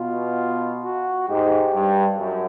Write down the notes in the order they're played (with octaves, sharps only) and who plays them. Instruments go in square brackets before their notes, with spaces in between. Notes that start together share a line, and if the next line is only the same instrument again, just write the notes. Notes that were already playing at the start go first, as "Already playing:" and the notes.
Already playing: [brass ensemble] B2 [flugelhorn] F4
[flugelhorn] F#4
[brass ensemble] G#2 [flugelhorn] G4
[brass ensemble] G2
F#2